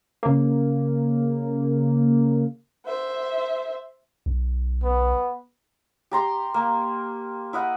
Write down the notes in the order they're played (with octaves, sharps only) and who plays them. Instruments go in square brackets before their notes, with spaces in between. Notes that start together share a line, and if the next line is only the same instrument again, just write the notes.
[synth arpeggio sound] C#3 A#3
[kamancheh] C5 E5
[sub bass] B1
[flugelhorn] B3
[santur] G4 A#5 C6
A#3
E4 D#5 F#5